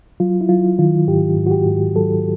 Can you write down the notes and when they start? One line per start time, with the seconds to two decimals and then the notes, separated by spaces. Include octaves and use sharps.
0.20 F#3 F4
0.41 E4
0.49 F#3 F4
0.79 D#3 F4
1.07 G#2 G4
1.37 G#2
1.46 F#4
1.51 G4
1.66 G#2
1.95 F#3 A4